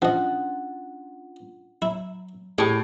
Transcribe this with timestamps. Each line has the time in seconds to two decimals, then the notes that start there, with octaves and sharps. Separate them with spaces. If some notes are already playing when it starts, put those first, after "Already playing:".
0.02 F3 C#4 D4 F4 D#5 F#5
1.82 F#3 E4
2.58 A2 A3 G4 G#4